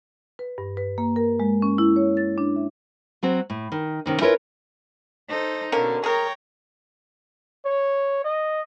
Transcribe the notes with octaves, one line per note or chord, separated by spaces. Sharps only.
B4
G2
B4
A#3
A#4
G#3
C#4
E4
C#5
A6
D4
E5
F#3 C4 F#4
A2
D#3
C3 D#3 C#4
C#4 E4 F4 A#4 B4 C#5
D#4 A4 C5
B2 D3 A#3 C#4 A#4
G#4 A#4 C#5 G5 A#5
C#5
D#5